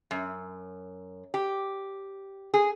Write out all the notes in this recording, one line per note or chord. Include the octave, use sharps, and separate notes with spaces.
F#2
G4
G#4